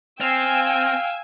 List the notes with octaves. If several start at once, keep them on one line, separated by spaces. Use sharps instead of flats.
C4 F5 G5 G#5 E6